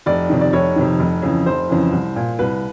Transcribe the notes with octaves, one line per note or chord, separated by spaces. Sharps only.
F1 D5
F2 C3 D#3
D5
F1 C#5
F2 C3 D#3
F1
F2 C#3 E3
F1 C5
F2 C#3 E3
C2
A#2
C2 B4